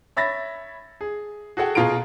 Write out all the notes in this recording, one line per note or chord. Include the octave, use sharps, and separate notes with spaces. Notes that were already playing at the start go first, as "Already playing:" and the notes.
C#5 E5 B5 A6 A#6
G#4
F#4 G#4 A4 F#5 G5
B2 F4 G#4 A#5 D7